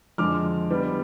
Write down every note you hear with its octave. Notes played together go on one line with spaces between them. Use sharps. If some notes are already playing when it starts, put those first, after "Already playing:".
F2 D3 G#3 D6 F6
D3 G3 B3